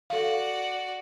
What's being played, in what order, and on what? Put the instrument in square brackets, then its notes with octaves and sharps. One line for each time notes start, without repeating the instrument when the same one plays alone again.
[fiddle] F#4 D5 [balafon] A4 F5